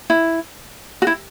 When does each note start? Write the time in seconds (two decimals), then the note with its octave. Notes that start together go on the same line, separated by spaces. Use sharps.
0.10 E4
1.02 F#4
1.07 E4